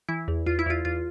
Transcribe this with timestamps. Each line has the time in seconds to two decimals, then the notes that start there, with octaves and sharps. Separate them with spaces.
0.09 E3 E4
0.28 E2
0.46 E2 F4
0.59 E4
0.66 E2 F4
0.85 E2 F4